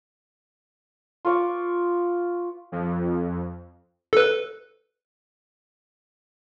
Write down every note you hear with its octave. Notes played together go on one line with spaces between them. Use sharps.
F4 B4 C#6 D6
F2
A4 B4